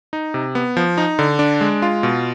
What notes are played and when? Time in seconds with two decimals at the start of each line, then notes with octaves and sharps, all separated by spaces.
0.13 D#4
0.34 C3
0.55 B3
0.77 F3
0.98 D#4
1.19 D3
1.39 D4
1.61 G#3
1.82 F4
2.03 B2